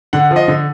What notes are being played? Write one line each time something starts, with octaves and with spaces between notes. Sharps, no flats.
D3 F#5
F3
D#5
D3